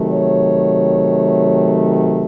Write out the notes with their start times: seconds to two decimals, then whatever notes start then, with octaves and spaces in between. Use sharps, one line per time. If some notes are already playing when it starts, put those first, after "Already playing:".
Already playing: C3 D#3 F#3 A3
0.11 C#5